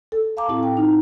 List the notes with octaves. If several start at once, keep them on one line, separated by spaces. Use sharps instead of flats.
A4
F5 A5 A#5 D6
A2 C4 E4 G4
G5
D#4